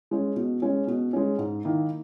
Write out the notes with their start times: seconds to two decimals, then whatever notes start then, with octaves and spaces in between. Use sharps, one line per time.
0.11 G#3 C#4
0.36 B2
0.62 G#3 C#4
0.87 B2
1.13 G#3 C#4
1.39 G#2
1.64 D#3 A#3 E4